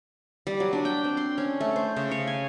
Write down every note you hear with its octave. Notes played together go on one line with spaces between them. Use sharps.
G3
F#3
D4
G5
C4
C6
C#4
A3
C5
C#3
C#5
G#5